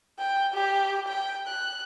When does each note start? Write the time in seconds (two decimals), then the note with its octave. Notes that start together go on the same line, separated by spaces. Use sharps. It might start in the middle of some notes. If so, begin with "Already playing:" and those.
0.19 G5
0.54 G4
1.08 G5
1.48 F#6